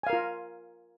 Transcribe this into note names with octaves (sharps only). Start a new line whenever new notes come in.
F4 A#4 F5 G#5